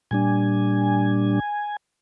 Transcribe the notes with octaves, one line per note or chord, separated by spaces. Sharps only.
A#2 G3 D4 G#5